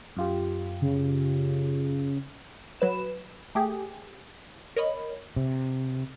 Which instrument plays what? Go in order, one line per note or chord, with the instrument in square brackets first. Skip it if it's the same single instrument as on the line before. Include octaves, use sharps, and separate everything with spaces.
[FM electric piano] F#2 F4 G4
[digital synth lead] C#3
[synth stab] F#3 B4 E7
A3 G4 G#4
A#4 C#5 D#5 B5
[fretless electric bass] C3